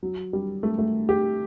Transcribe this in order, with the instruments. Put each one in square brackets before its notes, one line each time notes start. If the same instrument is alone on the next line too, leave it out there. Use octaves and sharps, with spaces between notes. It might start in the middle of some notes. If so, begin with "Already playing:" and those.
[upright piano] F#3
G3
A3
A3
G4